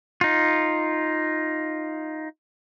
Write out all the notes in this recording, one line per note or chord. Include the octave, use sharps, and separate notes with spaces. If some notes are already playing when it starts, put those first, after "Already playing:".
D#4 F4